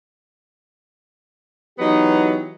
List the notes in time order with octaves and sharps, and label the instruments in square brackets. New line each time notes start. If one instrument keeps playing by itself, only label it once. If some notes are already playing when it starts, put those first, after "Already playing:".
[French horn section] E3 G4 [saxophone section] F#3 B3 D#4